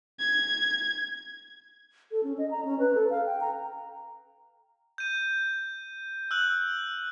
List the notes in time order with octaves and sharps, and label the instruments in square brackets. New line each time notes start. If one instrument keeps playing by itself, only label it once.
[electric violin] G#6
[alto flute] A4
C#4
D#5
A#5
C#4
B4
A4
F5
G5
A#5
[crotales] G6 D#7
E6 F#6 F#7